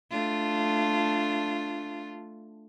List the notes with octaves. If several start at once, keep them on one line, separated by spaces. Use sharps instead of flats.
A3 D4 F4